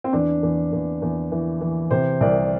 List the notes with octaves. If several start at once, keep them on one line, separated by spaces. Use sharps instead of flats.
C4
E2 D4
E2
E2
E2
E3
E3
C3 C5
C2 D5